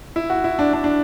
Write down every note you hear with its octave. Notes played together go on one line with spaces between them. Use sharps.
E4
F#4
E4
D4
D4
D4